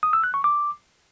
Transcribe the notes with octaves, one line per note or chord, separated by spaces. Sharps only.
D#6
E6
F#6
C#6
D6